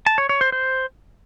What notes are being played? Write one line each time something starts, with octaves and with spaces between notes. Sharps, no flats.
A5
C#5
C#5
C5
C5